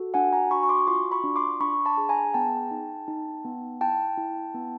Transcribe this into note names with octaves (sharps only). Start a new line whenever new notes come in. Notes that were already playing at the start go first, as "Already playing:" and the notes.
Already playing: F#4 A4
D4 F#5 G#5
G#5 A#5
F#4 B5 C#6
C#6
C6 D6
F4 C6 D6
B5 C#6
D4
C6 D6
D4 B5 C#6
A5 B5
G#4
G#5 A#5
B3 G5 A5
D#4
D#4
B3
E4 G5 A5
E4
B3